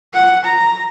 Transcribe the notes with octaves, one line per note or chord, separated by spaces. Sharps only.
F#5
A#5